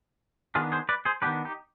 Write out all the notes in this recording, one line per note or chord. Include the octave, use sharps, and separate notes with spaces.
D#3 B3 D4 F4 G#4
G#4 C5
B4 D5
G#4 C5
D#3 B3 D4 G4 B4
D#4 G4